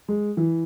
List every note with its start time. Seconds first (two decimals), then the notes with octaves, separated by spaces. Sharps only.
0.08 G#3
0.37 E3